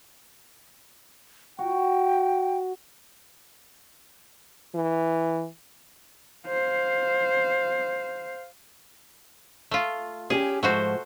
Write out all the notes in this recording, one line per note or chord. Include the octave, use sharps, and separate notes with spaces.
F#4 G5
E3
C5 F5
A3 F4
C#4 G4 G#4
G#2 F3 A3 F#4 C5